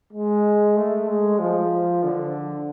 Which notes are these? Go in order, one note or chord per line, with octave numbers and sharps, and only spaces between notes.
G#3
A3
G#3
F3
D3